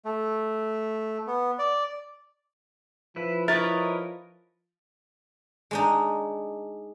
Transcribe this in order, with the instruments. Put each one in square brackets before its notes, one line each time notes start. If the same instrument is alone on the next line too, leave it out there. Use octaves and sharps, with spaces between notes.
[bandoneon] A3
B3
D5
[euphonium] F3 [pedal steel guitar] E4 B4
[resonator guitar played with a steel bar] E4 B4 [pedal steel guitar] A#4 C#5 D#5 [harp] A6
[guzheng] G#3 D4 D#4